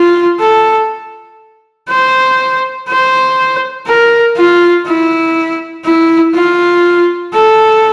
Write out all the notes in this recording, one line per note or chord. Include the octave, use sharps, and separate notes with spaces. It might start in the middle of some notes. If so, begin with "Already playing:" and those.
Already playing: F4
A4
C5
C5
A#4
F4
E4
E4
F4
A4